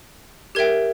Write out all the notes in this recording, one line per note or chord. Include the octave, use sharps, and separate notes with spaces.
G4 A#4 E5 G5 G#6